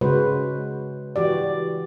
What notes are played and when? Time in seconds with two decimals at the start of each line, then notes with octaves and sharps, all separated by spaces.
0.01 C#3 G#3 F#4 B4 C5
1.16 E3 F#4 G4 D5